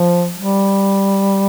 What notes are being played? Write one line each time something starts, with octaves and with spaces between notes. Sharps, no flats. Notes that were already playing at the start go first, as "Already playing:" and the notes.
Already playing: F3
G3